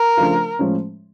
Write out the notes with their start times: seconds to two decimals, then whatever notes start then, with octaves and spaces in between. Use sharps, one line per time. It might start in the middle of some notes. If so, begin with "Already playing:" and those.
Already playing: A#4
0.17 C#3 F3 A3 D4 F4
0.59 A2 F3 G#3 C#4